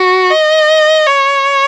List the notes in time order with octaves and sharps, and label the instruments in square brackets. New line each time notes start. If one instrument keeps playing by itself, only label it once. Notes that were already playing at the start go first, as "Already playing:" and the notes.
Already playing: [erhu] F#4
D#5
C#5